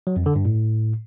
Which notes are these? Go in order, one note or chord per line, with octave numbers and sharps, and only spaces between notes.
F#3
F2
D3
G2
A2